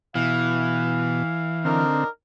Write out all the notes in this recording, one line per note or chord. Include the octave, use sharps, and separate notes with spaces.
B2 E3 F5
D3 C4 D4 D#4 A#4